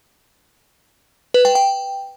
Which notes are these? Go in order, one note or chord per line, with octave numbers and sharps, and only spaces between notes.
B4
G5
G5